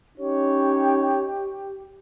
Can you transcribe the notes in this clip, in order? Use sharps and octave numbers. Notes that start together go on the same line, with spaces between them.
C#4 D#4 G4 C#5